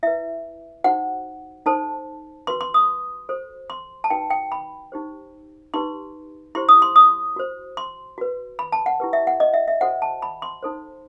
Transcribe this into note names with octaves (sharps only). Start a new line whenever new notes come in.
E4 B4 E5
D#4 F#4 C5 F#5
D#4 A4 C5 A5
F#4 B4 C6
C6
D#6
F#4 A4 C5
C6
A5
D#4 F#4 B4 G5
G5
B5
D#4 G4 C5
D#4 G4 B4 C6
E4 G4 C5 C6
D#6
C6
D#6
F#4 C5
C6
F#4 B4
B5
A5
F#5
E4 G4 B4
E5
F#5
D#5
E5
E5
F#4 A4 C5 F#5
A5
B5
C6
D#4 A4 C5